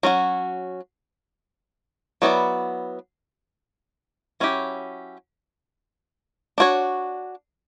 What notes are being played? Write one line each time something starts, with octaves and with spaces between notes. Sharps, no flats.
F#3 C#4 F#4
F#3 B3 E4 B4 D5
F#3 C#4 E4 G4
D4 F#4 C#5